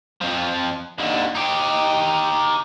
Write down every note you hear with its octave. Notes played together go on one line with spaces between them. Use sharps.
F2 F3
D#2 D3
D#4 G4